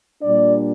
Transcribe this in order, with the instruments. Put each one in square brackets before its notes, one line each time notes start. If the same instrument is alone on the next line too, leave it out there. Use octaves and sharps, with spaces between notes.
[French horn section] A#2 G3 D4 D5